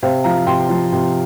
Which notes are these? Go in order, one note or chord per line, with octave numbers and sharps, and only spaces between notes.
C3 C5 F5
F3 F5 A#5
C3 G5 C6
F3
C3